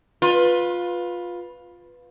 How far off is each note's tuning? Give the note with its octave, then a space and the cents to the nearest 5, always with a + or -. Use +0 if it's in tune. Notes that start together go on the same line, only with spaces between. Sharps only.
F4 +15 B4 -5